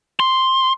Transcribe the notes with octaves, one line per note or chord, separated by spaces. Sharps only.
C6